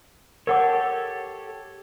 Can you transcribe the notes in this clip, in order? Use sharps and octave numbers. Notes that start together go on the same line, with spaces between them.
G4 A4 A#4 C#5 F#5 D6